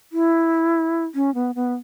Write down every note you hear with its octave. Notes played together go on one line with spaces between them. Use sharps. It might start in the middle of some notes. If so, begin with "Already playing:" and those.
E4
C#4
B3
B3